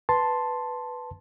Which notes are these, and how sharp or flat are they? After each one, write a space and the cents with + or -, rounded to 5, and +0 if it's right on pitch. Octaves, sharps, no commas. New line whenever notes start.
B4 +0 A5 +0 C6 +0